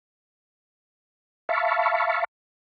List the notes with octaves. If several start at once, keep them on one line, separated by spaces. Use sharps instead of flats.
E5 F5 A5 B5 C#6